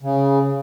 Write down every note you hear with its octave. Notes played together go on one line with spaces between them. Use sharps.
C#3